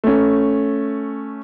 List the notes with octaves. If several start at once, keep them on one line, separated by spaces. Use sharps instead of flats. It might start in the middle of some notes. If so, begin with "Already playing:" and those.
A3 C#4